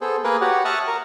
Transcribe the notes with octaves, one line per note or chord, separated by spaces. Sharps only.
B3 G#4 A4 C5
A#3 G#4 A#4 B4
F#4 G4 C#5 F#5
E5 A5 C#6 D#6 F6 F#6
A#4 A#5